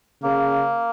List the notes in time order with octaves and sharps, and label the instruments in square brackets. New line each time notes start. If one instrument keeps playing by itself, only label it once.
[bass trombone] C#3 [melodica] A#3